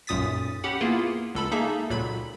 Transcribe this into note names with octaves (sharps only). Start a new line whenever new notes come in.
B1 F#2 A#2 D#6 A6 B6
C#4 G4 F#5 B5
A#3 B3 E4 F4 G#4
C#2 A4 B5
A#3 D#4 G#4 A4 E5
C#2 A#2 F#3 B5